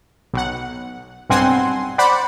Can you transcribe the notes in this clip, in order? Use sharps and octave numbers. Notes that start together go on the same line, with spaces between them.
B1 F#5
B1 G2 C4 F#5 G#5 C6
C5 D5 F#5 B5